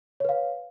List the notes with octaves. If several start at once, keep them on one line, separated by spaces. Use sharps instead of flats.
B4 C#5 F5